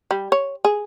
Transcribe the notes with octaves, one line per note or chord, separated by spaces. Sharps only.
G3
C#5
G#4